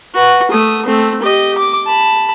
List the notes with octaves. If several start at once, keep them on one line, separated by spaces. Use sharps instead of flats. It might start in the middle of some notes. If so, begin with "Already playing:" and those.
F#4 B4
A3 D#6
A3 C4
G4 D#5
D6
A5 B5